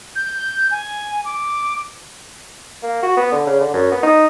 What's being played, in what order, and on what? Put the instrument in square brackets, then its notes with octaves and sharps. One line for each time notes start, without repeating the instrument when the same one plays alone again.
[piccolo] G6
G#5
D6
[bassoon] A#3
F#4
B3
D3
C#3
D3
F#2
B3
D#4